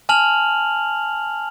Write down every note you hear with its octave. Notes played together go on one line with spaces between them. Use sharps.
G#5 A5 F6 F7 F#7